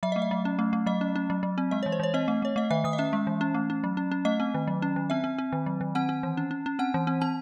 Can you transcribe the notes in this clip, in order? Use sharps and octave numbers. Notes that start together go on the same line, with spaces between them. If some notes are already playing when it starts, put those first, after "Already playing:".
F#3 E5
A3 D#5
E5
F#3
C#4
A3
A3
F#3 D#5
C#4
C#4
F#3
F#3
C4
G#3 D#5
C#5
E3
C5
E3 C#5
C4 D#5
A3
A3 C#5
A3 D#5
D#3 E5
D#3 D#6
D#5
C#4 E5
G#3
E3
C#4
A3
C#4
F#3
C#4
C#4
A3 D#5
C4
D#3
F#3
C#4
D#3
C4 E5
C4
C4
D#3
F#3
D#3
C4 F#5
C4
E3
C#4
C#4
C#4
C4 F#5
E3
C4
C4 A5